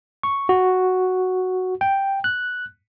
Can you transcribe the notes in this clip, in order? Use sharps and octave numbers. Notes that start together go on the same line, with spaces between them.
C#6
F#4
G5
F#6